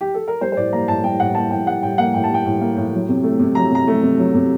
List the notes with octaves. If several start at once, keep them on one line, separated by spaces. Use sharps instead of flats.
G4
A4
A#4
G3 C5
C5
A2 D5
A#3 A#5
A2 A5
G3 G5
A2 F#5
A#3 A5
A2 G5
G3 F#5
A2 G5
A#3 F#5
A2 G5
A5
G3 G5
A2
A#3
A2
F#3
C3
A3
C3
F#3 A#5
C3 A#5
A3
C3
F#3
C3